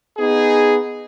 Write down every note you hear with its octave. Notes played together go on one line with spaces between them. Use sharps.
B3 D#4 G#4